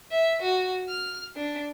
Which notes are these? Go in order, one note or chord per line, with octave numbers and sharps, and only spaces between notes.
E5
F#4
F6
D4